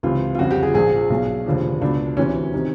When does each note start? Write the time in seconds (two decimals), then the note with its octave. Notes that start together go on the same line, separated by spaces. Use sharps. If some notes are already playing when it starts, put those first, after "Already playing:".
0.03 C#2 C3 E3 F4
0.35 F4
0.38 G1 F2 C#3 F#4
0.51 G4
0.63 G#4
0.74 A#1 A#2 F3 G#4
1.10 B1 B2
1.46 F1 D#2 D3 F3
1.81 C#2 B2 D4
2.17 D2 C3 E3 C#4
2.54 C3 D#3